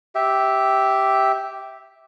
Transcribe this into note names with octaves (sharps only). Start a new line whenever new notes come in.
G4 E5